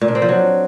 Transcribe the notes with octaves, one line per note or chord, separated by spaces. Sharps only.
A#2
D4
C4
F3
F#3